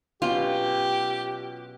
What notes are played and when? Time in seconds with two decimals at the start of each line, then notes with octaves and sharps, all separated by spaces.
0.22 B2 F#3 C#4 F4 G4